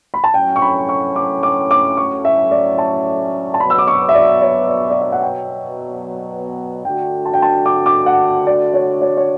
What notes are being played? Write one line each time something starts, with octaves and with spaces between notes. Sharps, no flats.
B5
A5
A2 F#3 C#4 G5
C#6
B5
C#6
D6
D6
D6
C#6
E5
D5
A5
A5
B2 F#3 B3 B5
E6
D6
C#6
E5
D5
C#5
D5
D5
E5
F#5
G5
D3 A3 D4 F#4 G5
A5
G5
A5
D6
D6
F#5
D5
C#5
C#5
C#5